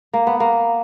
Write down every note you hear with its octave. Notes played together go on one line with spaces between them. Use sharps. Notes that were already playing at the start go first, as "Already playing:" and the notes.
A#3
B3
A#3